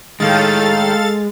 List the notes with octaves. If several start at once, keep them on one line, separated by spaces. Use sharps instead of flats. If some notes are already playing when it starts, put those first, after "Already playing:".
A2 D#3 G#3 A4 F5 A6